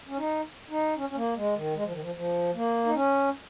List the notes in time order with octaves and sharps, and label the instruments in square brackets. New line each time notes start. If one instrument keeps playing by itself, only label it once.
[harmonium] C#4
D#4
D#4
C#4
C#4
A#3
G#3
D#3
G#3
F3
D#3
F3
F3
A#3
D#4
C#4